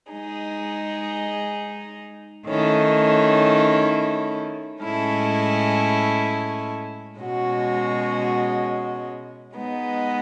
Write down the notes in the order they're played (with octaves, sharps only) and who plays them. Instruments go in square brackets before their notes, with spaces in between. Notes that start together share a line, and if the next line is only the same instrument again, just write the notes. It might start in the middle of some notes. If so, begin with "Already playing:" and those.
[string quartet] G#3 D#4 G#4
D#3 A3 C#4 E4
A2 G#3 C#4 E4 A4
B2 G#3 C#4 F#4
G#3 B3 D#4